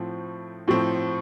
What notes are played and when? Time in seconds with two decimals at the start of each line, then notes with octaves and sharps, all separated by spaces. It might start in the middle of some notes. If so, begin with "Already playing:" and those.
Already playing: A2 F3 C4
0.68 A2 F3 C4